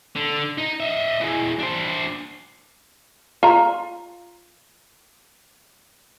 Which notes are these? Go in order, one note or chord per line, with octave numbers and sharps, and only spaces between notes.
D3
D#4
D#5 E5
E3 G#3
D4 C5
F4 A#5